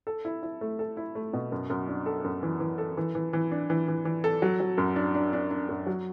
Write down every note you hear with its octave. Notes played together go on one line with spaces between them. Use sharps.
A4
E4
E4
A3
A4
E4
A3
B2
F#2
F#2
D4
A4
F#2
E3
E3
A4
E3
E3
E3
D4
E3
E3
E3
A4
F#3
F#3
F#2
D4
D4
D4
D4
F#2
F#3